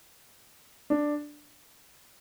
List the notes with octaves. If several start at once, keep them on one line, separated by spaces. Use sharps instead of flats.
D4